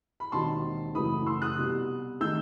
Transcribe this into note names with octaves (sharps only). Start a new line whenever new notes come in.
B5
E1 D#2 D#3 F#3 C4 A5 C6
F#1 F#2 E3 A3 B5 D#6
C6 E6
D#6 F#6
C2 B2 G3
D#3 A3 E6 G6